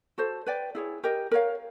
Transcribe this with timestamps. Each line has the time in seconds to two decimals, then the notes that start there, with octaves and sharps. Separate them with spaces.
0.18 F#4 A4 C5
0.46 B4 D5 G5
0.75 E4 G#4 C#5
1.04 G4 A#4 D#5
1.31 A#4 C#5 F5